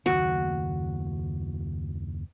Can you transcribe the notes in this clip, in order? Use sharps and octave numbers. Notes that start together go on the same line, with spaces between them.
F#1 D#2 D#3 F#4